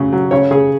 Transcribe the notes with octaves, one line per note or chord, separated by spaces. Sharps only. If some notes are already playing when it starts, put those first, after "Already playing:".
Already playing: C#3 F#3
F#3
C#3 C#5
C#3 G#4